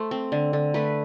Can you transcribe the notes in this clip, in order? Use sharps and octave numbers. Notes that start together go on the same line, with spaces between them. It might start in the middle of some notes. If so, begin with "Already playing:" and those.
Already playing: A3 C5
C4
D3
D3
A3 B4